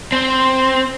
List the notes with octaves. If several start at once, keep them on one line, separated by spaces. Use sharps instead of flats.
C4